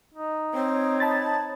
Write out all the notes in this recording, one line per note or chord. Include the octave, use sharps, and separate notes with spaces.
D#4
C4 C#5
A5 B5 A6